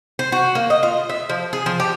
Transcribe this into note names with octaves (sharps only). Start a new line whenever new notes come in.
C5
F#4
A#3
D#5
F4
E5
F3
G#4
F3
G4